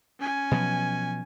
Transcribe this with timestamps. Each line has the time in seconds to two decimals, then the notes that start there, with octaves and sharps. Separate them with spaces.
0.19 C#4 G#5
0.51 B2 F3 F#3